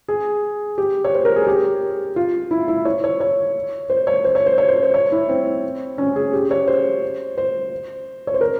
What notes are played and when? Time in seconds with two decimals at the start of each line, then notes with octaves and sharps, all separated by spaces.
0.08 G#4
0.78 G4
1.04 C#5
1.14 C5
1.25 A#4
1.36 G#4
1.47 G4
2.16 F4
2.51 E4
2.68 E4
2.85 C#5
3.04 C#5
3.20 C#5
3.90 C5
4.07 C#5
4.25 C5
4.35 C#5
4.46 C5
4.58 C#5
4.69 C5
4.83 C5
4.94 C#5
5.12 E4
5.29 C4
5.98 C#4
6.16 G#4
6.33 G4
6.51 C#5
6.68 C5
7.38 C5
8.27 C#5
8.34 C5
8.41 A#4